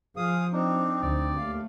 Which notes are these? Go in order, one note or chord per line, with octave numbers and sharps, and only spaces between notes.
F3 G#4 F5 D#6
C4 D4 D#4
D2 D5
D#2 A3 F5